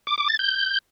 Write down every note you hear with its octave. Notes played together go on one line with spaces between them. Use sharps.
D6
D6
A6
G6